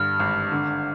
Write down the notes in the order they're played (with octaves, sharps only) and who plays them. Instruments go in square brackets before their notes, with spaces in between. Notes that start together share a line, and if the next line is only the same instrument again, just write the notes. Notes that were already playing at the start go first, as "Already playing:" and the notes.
Already playing: [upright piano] G2 D3 [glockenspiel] F6
[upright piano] G#1
D3